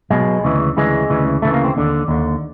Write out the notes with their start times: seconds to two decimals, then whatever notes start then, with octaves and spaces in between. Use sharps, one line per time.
0.10 B1 B2 G#3
0.44 D2 C#3 E3
0.77 D2 C#3 E3 G#3
1.10 D2 C#3 E3
1.42 D2 C#3 E3 A3
1.54 A#3
1.64 C4
1.76 D#2 D3
2.08 D#2 D3